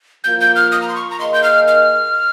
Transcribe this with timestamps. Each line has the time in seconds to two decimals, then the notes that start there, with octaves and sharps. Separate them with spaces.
0.24 F3 A#3 F4 G6
0.40 G6
0.56 F6
0.72 D#6
0.82 A#5
0.89 C6
0.96 C#6
1.11 A#5
1.20 D#3 A#3 D#4 G#4 D#5 C6
1.34 G6
1.44 F6
1.68 F6